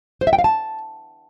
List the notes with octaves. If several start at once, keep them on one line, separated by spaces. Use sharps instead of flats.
C5
E5
G5
F5
A5